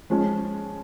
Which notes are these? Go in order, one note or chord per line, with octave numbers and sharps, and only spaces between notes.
F3 G#3 C#4